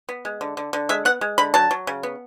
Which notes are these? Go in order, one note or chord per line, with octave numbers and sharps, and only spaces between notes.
B3
G#3
D3
D3
D3
G#3 E5
B3 F#5
G#3
D3 B5
F#3 A5
F#3
C#3
B3